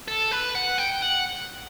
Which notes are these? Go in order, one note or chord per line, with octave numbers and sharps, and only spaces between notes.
A4
B4
F#5
G5
F#5